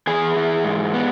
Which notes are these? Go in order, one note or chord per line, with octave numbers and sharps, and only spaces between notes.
E3 G#4 G#5
E3
G#2
B3